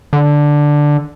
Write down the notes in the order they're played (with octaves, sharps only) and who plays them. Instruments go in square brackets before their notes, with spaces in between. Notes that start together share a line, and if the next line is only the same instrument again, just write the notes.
[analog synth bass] D3